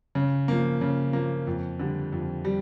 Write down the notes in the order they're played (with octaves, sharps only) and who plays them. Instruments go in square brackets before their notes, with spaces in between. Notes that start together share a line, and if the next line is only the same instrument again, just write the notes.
[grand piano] C#3
F3 A#3
C#3
F3 A#3
F2
D3 G3
F2
G3